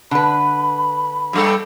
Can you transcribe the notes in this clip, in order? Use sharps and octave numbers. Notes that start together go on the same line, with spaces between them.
D3 B4 B5
G2 G3 A4